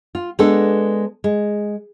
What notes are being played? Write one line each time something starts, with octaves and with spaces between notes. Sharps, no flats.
F4
G#3 B3 D4 A4
G#3